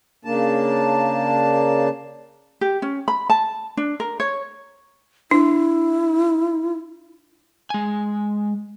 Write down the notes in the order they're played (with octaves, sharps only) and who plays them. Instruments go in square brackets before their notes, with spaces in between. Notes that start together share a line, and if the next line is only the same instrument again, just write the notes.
[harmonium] C#3 A#3 D4 A5
[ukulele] G4
C#4
B5
A5
D4
A#4
C#5
[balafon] D4 [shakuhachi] E4
[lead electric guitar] G#3 G#5